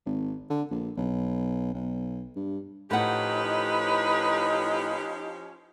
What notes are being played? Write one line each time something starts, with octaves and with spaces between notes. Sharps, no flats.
G#1
D3
A#1
B1
B1
G2
A2 F3 C#4 D#4 G4 B4 F#5